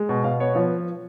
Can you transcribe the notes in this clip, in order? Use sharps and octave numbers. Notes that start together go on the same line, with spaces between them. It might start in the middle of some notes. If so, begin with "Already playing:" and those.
Already playing: G#3
B2
B2 F5
B3 C#5
F3 C#5